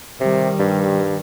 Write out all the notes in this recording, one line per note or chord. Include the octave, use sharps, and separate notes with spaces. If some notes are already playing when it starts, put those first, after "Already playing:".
C3 D#3 G3
G2